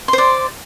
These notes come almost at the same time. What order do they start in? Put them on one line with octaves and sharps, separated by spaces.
C6 C5 D5